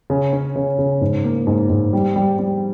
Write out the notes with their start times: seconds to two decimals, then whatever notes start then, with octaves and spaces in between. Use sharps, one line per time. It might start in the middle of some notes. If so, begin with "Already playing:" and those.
0.10 C#3
0.33 C#4
0.56 C#3
0.79 C#3
1.01 G#2
1.24 A#3
1.47 G#2
1.70 G#2
1.93 G3
2.16 G3
2.39 G3